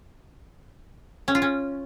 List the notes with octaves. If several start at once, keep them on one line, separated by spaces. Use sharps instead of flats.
C#4
F4
C#4